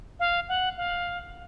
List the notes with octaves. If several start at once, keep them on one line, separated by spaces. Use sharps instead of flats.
F5
F#5
F5